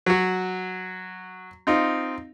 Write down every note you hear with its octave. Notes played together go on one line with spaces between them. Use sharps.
F#3 F#4
C4 D#4 F4